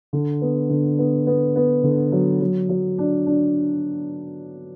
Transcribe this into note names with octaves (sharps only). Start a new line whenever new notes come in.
D3
B3
D3
B3
B3
B3
D3
F#3
F#3
F#3
D4
D4